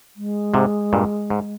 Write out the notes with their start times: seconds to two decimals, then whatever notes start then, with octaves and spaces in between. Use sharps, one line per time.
0.16 G#3
0.54 G#2 C3
0.93 G2 A#2
1.30 G#2